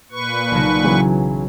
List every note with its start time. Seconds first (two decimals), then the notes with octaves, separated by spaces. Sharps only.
0.12 A#2 B4 C#6
0.51 B1 C#3 F#3
0.83 C#3 E3 F#3 B5